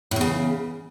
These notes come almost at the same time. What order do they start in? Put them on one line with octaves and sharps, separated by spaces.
A2 E2 C#3